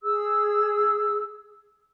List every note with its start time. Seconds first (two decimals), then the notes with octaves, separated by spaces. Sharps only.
0.03 G#4 E6